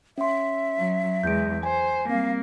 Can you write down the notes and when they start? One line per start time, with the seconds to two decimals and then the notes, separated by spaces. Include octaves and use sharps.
0.18 C#4 E5 C6
0.79 F#3
1.23 E2 G#3 G6 D7
1.63 C5 G#5
2.09 G3 A#3 C4 F5